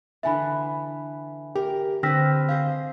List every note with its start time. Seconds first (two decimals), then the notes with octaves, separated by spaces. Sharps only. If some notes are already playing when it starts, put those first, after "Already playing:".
0.23 D3 E3 B4 E5 G#5 B5
1.56 G4 A#4
2.03 D3 C4 B4 G5 E6 F6 A#6 B6
2.49 G#4 C5 D#5 F5